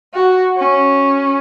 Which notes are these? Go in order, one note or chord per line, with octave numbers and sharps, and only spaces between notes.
F#4
C#4